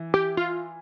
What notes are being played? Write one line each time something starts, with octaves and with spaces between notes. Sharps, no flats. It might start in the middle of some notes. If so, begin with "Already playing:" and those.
Already playing: E3
G4
F4